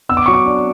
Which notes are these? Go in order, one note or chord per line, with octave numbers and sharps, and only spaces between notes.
B3 E6
D6
F#3 C#6
D6
D4